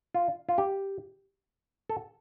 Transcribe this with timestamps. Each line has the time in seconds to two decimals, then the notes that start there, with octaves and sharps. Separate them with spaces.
0.14 F4
0.49 F4
0.58 G4
1.89 A4